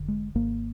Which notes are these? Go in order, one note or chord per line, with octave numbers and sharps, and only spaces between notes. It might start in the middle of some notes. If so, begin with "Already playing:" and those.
Already playing: F1 D3
G#3
G#1 G#2 A#3